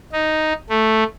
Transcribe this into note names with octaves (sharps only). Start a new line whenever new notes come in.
D#4
A3